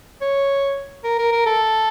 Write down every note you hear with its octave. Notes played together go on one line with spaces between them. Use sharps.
C#5
A#4
A#4
A#4
A4